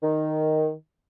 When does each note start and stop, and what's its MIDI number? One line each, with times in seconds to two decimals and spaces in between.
0.03 0.70 51